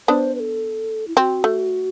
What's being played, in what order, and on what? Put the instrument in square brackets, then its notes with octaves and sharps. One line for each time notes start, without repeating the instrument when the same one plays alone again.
[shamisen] B3 D4 [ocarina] C5
[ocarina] B4
A4
E4
[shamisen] C4 [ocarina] F#4
[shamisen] A3